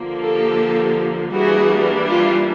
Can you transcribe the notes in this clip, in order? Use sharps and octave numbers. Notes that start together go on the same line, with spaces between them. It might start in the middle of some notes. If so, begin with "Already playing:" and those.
Already playing: D3 F3 A#3
G4 A4
E3 G3 A#3 D4 F#4 G#4
F4 G4